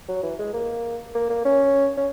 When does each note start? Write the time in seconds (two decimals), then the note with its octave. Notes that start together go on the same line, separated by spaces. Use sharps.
0.08 F#3
0.23 E3
0.39 G#3
0.54 A#3
1.15 A#3
1.30 A#3
1.45 C#4
1.97 C#4